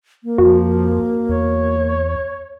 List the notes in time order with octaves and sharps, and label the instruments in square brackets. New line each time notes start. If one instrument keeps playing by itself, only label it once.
[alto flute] A#3
[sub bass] F2 [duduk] F3 [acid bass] F#4
[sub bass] E2 [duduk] C#5